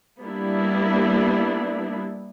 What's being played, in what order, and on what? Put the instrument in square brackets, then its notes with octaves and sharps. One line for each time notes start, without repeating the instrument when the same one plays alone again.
[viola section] G3 A#3 B3 D4 E4